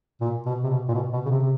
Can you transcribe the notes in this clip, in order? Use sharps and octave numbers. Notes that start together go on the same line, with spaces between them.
A#2
B2
C3
B2
A#2
B2
B2
C#3
C3
C3